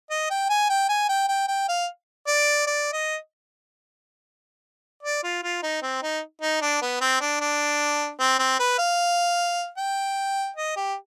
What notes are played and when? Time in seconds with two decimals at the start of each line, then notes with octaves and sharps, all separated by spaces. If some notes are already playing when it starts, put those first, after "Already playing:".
0.10 D#5
0.30 G5
0.49 G#5
0.70 G5
0.89 G#5
1.09 G5
1.28 G5
1.48 G5
1.68 F5
2.27 D5
2.67 D5
2.93 D#5
5.03 D5
5.23 F4
5.43 F4
5.63 D#4
5.82 C4
6.02 D#4
6.42 D#4
6.62 D4
6.82 B3
7.01 C4
7.21 D4
7.41 D4
8.19 C4
8.39 C4
8.60 B4
8.78 F5
9.77 G5
10.56 D#5
10.76 G4